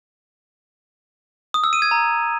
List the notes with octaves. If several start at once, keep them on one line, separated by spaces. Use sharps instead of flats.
D#6
E6
D#7
G#6
A#5